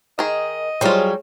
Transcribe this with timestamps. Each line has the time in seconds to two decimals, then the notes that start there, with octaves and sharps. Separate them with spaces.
0.19 D#3 G#4 D#5
0.81 F#3 G3 F4 G#4 C5 C#5